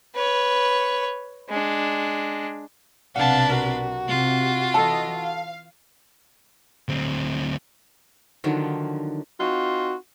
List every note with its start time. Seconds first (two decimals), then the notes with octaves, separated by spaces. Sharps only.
0.15 B4 C#5
1.49 G#3 D4
3.16 B1 C3 D4 B4 F5 F#5 A5
3.50 F#4 A#4
4.09 C3 F4
4.74 E3 A4 D#5 A5
5.17 F5
6.89 D2 C4
8.44 D3 D#3 F3 F#3
9.40 C4 D#4 F4 F#4